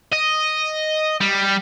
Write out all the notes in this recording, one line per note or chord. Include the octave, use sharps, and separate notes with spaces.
D#5
G3